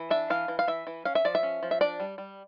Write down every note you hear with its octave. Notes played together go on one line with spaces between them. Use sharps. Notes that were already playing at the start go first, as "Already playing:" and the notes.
Already playing: E3
D4 E5
E3 F5
E3
F5
E3 E5
E3
C#4 F5
E5
F3 D5
E5
C#4
F3
E5
D4 D5
G3
G3